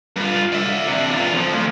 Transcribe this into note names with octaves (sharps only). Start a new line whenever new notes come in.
G2 F4
D5 E5
C3 D4
E2 F4
F2 F3
D2